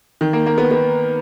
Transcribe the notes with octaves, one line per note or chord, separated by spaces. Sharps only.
D#3
A#3
A#3
B3
B3